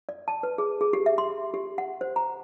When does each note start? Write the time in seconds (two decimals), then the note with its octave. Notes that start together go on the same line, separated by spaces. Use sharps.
0.09 D5
0.28 A5
0.43 B4
0.58 G#4
0.81 G#4
0.93 G4
1.06 E5
1.18 C6
1.54 G4
1.78 F#5
2.01 C5
2.16 A#5